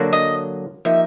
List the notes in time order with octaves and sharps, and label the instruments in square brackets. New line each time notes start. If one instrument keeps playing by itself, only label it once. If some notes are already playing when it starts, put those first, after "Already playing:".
Already playing: [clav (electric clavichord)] D3 F#3 A#3 D4 F#4
[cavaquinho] D#5
[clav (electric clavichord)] F3 A#3 D#4 G4 [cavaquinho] E5